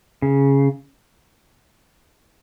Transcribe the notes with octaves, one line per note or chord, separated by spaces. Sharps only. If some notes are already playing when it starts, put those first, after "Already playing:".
C#3